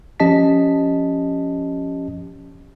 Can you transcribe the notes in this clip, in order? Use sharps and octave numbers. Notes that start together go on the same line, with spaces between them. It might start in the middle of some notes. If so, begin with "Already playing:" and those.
F3 C#4 G4 D#5 A5 B6